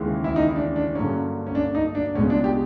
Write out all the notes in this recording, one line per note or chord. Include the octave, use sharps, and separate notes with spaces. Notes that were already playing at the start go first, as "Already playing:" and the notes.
Already playing: D#2 C#3 E3 G#3
E4
D#4
D4
D4
G2 D3 F#3 A#3 C#4
C#4
D4
D#4
D4
C#2 B2 G#3 C#4
D4
G4